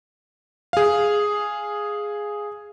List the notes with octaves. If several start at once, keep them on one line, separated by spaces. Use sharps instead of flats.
G#4 F5